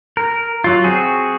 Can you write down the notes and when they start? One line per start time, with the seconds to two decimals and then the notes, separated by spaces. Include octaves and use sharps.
0.17 A#4
0.64 F#3 F4
0.84 C4 F#4 G#4